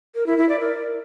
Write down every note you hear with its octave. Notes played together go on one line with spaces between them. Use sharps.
A#4
E4
E4
D5
A#4